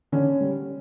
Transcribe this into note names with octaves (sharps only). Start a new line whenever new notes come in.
D3 C#4
G3